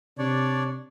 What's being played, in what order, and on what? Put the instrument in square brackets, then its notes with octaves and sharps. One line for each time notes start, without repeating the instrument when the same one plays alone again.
[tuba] C3 [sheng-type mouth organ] D4 C#5 D5